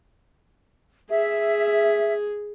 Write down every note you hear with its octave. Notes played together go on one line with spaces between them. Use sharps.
G#4 E5